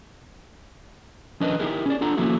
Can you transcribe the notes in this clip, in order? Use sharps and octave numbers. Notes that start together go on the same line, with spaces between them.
F3 C#4 D4 A#4 B4 D#5
D#4 E4 G4 G#4 A#4
C#4 C#5 D5
D4 F4 A4 F#5 A#5
F3 A#3 C#4 E4 F#4 A4